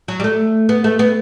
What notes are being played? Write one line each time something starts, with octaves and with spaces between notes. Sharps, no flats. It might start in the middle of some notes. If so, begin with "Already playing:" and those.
F#3
G3
A3
B3
A3
B3